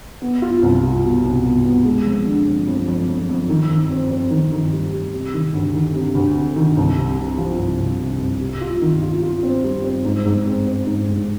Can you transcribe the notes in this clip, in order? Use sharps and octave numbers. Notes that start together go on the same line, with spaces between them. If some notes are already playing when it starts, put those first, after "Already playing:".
B3
F4
C2
F4
B2
C2
B2
B3
G#3
F2
D3
F2
F2
F2
F2
F2
D#3
D#3
C4
C4
D#3
D#3
G3
G3
C3
D#3
D2
D#3
C3
D2
C3
D#3
C2
C3
C3
F3
C2
C2
C3
C2
G3
F4
D#3
F4
F4
C4
G3
C4
G#2
G#2
C4
C4
G#2
G#2